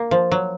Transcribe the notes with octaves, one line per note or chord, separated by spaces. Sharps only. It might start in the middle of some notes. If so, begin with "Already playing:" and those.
Already playing: A#3
F3
F#3